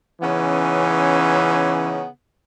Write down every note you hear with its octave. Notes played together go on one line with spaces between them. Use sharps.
C#3 E3 B3 C#4 D#4